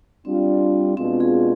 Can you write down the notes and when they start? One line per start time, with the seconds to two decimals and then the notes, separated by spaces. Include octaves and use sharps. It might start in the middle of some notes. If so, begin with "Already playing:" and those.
0.25 G3 C4 D4 F4
0.96 B2 G#3 C4 D4 F4
1.20 G#4